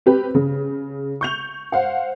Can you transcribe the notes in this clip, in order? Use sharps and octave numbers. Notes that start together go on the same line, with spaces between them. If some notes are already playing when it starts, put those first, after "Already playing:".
C4 G4 B4
C#3
C#6 G6 F7
C5 F5 F#5